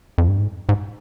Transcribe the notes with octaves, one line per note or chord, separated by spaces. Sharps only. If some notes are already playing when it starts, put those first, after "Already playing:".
F2
G2
G#2
G#2